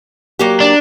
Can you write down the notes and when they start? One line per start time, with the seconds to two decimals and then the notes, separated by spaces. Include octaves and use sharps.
0.39 F#3 A#3 G4
0.61 D4